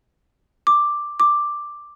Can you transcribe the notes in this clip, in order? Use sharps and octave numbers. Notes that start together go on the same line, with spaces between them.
D6
D6